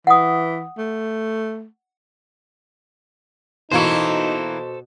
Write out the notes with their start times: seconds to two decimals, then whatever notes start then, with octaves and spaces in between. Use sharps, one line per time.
0.07 E3 F#5 D#6
0.78 A3
3.72 B2 E3 A#3 D#4 E4 A4 C5 C#6